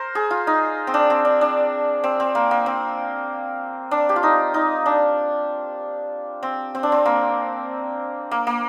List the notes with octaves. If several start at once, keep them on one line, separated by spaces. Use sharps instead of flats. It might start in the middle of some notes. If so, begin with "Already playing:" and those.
Already playing: A#4 C5
G#4
F4
D#4
C4
D4
C4
D4
D4
C4
C4
A#3
A#3
C4
D4
G4
F4
D#4
D#4
D4
C4
C4
D4
C4
A#3
A#3
A#3